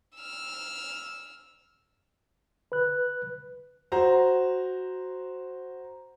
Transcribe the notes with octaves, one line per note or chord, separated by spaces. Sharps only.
E6 F6
B4 F#6
F#4 C5 A#5